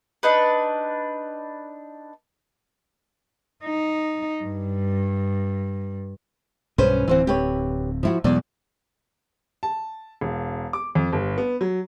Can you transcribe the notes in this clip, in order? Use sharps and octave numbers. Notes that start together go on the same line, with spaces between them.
D4 D#4 B4
D#4
G2
B1 G2 B2 C#4 B4 C5
D1 E3 C4 C5 F#5
G4 B4 C#5
F3 E4 F#4
E2 B2 F#3 G#3 D5
A5
E1
D6
F2
G1
B3
F#3